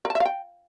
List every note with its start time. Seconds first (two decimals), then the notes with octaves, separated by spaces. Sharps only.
0.05 A#4
0.10 A5
0.15 E5
0.20 F5
0.25 G5